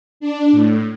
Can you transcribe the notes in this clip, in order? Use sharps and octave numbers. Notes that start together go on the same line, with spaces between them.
D4
A2